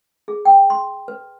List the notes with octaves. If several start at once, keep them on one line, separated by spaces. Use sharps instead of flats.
G#4
G5
C6
B4